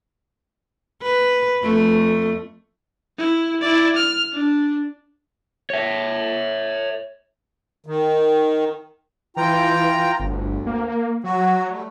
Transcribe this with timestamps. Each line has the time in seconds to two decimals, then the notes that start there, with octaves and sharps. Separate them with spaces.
1.02 B4
1.63 F2 A3
3.18 E4
3.61 E4 D5
3.95 F6
4.32 D4
5.70 C#5 E5
7.86 D#3
9.37 E3 F4 G5 A#5
10.20 G1 D2
10.66 A#3
11.24 F#3 F#4
11.70 G3 A3